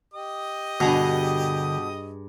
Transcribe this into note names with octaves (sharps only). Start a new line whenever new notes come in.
G4 D#5 D#6
G2 B2 D3 G#4 A#5